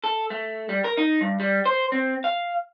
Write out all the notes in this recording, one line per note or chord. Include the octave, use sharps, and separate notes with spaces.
A4
A3
G3
A#4
D#4
G2
G3
C5
C4
F5